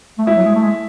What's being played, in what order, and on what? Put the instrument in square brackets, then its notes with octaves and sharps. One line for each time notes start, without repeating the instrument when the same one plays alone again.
[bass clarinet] A3
[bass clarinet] G#3 [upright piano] E4
[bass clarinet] F#3
G#3
A3
G#3